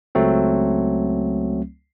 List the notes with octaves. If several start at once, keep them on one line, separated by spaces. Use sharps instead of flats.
C#2 F#3 A3 C4